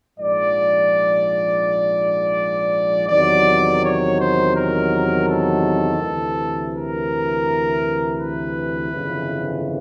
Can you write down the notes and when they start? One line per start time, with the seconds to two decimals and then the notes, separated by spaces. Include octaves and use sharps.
0.18 A#1 G#2 F3 D5
3.09 E2 C3 D#3 F#3 D5
3.82 C#5
4.19 C5
4.55 A#4
5.28 A4
6.01 D2 C3 E3
6.74 A#4
8.18 B4
8.92 G1 F2 C#3 E3